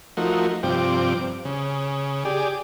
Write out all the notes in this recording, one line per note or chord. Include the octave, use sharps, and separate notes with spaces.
F3 A3 D#4 F#4 A#4
G2 C3 F3 C4 G5 D6
C#3
G4 G#4 D5